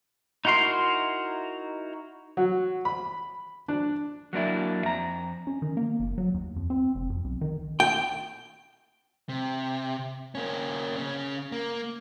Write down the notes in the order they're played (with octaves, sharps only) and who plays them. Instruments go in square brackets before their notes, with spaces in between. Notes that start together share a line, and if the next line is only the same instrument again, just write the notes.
[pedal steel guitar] D#4 E4 F#4 A#4 C6
[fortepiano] F#3
B5
D4
[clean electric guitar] F#3 A#3 D4 E4
F2 A#5
[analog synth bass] C#4
D#3
A#3
F#1
F#3
D#2
F2
C4
F1
F2
B1
D#3
[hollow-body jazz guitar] G5
[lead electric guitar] C3
A#3 C#4
C#3 C#4
A#3